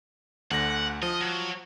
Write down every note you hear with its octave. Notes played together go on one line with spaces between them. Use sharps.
D2 D3 F#5 A#6
F3 D#5
F#3